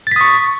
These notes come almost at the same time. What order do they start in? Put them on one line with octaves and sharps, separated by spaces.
A6 B6 D#6 C#6